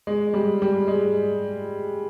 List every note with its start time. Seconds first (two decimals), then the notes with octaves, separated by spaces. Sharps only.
0.07 G#3
0.34 G3
0.62 G3
0.88 G#3